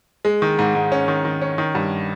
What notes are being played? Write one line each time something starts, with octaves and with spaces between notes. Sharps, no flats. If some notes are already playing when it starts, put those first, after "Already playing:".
G#3
D#3
G#2
G#2
C#4
D#3
D#3
C#4
D#3
G2